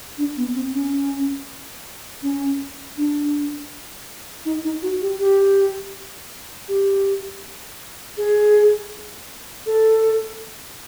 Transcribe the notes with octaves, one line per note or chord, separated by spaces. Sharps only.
D4
B3
C4
C#4
C#4
D4
D#4
D#4
F#4
G4
G4
G4
G#4
A4